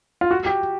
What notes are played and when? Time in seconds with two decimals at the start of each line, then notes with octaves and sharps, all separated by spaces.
0.21 F4
0.31 F#4
0.46 G4